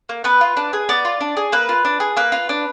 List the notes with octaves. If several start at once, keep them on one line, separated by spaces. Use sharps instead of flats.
A#3
B3 B4
F4
D4
G#4
B3 D5
F4
D4
G#4
A#3 B4
F4
D4
G#4
A#3 B4
F4
D4